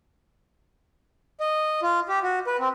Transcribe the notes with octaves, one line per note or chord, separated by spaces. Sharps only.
D#5
F4
G4
F#4
B4
C4